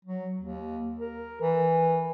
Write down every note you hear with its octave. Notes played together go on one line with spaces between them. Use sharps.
F#3
D#2
A#4
E3